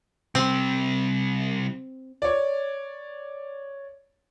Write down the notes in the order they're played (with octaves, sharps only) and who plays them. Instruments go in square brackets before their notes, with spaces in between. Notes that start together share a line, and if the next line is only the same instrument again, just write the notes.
[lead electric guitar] C3 G3 [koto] C4
[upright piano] C#5 D5